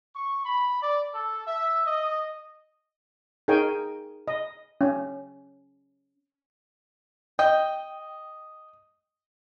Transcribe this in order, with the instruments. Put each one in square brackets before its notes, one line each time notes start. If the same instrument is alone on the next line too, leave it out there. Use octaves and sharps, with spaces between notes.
[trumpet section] C#6
B5
D5
A4
E5
D#5
[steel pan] D#4 G#4 A#4 C#5 G5 G#5
D#5
C#4
[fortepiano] D#5 [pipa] G5